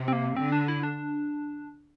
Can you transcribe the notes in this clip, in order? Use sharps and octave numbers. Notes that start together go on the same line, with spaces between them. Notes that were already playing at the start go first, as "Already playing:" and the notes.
Already playing: C3
C4
A#3
D3 C4
D4
E4
D4